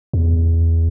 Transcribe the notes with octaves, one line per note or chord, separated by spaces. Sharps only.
E2